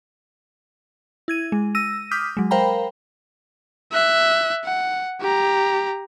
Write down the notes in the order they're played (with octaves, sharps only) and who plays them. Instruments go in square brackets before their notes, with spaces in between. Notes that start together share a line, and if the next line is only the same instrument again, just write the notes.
[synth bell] E4 G#6 D#7
G#3
E6 A#6 D#7
D6 D#6 F6 G6 B6
F#3 G#3
A#4 C5 F5 G5 A#5 B5
[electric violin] E5 F#6
F#5
G4 A#5